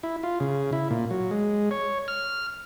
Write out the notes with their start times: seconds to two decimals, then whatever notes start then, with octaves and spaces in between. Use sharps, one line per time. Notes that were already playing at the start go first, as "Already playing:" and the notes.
0.03 E4
0.23 F4
0.40 C#3
0.73 E4
0.91 A#2
1.11 F#3
1.31 G#3
1.71 C#5
2.08 F6